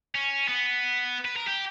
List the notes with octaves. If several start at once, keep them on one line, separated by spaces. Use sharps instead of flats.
C#4
B3
B4
A#4
G4